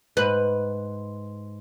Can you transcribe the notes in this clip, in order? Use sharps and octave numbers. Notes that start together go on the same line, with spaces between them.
G#2 B4